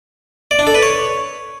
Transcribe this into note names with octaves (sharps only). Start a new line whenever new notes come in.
D5
D4
A4
B4
C#5